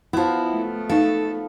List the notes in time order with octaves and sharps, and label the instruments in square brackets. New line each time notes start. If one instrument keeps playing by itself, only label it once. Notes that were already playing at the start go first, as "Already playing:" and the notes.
[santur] F3 B3 [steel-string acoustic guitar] E4 F#4
[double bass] A3
[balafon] D#4 F5 [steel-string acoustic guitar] A4